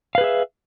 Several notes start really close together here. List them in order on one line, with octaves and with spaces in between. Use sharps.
F5 B4 G#4 E5